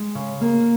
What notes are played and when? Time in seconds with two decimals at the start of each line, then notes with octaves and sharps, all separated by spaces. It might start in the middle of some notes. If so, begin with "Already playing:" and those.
Already playing: G#3
0.15 C#3
0.41 A#3